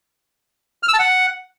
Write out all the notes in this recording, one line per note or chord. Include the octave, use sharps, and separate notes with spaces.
F6
E6
A5
F#5